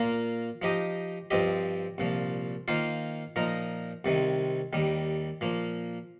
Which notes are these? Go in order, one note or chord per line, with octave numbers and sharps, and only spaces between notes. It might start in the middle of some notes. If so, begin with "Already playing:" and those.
Already playing: A#2 A#3 F4 A#4
F3 D#4 G4 D#5
G2 F3 C4 G4 D#5
C2 A#2 F3
D#3 A#3 F4 C5
A#2 F3 D#4 A#4
C2 C3 D#3
D#2 D#3 G3
A#2 F3 A#3